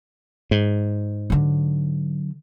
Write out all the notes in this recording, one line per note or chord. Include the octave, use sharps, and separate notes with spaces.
G#2
D3 F#3